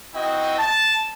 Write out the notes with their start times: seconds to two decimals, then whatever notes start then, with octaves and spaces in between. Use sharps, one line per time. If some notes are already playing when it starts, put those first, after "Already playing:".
0.15 C4 E4 F#4 D#5 G5
0.58 A5